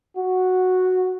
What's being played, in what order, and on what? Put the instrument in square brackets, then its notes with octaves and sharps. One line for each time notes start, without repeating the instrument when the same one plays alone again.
[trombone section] F#4